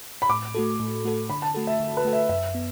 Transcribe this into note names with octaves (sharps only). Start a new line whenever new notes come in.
B5
A2 D6
A3 F#4 A4
A2
A3 F#4 A4
D3 B5
A5
A3 F#4 A4
E5
D3
B4
A3 F#4 A4
E5
F#2 E5
B3